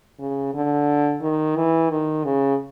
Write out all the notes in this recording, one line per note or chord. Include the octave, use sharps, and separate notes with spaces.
C#3
D3
D#3
E3
D#3
C#3